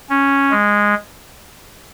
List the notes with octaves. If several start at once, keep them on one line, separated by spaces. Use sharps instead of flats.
C#4
G#3